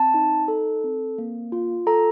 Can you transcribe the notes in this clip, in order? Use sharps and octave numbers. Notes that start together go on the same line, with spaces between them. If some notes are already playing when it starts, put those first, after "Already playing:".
Already playing: C4 A5
D#4
A4
C4
A#3
F4
A4 A#5